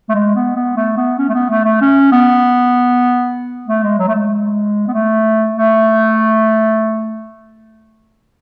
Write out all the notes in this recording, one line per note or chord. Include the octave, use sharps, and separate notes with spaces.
A3
G#3
B3
B3
A3
B3
C#4
A3
B3
A3
A3
C#4
B3
A3
G#3
F#3
A3
G#3
B3
A3
A3